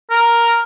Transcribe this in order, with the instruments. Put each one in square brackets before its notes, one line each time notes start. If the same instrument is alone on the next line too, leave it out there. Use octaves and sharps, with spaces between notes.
[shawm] A#4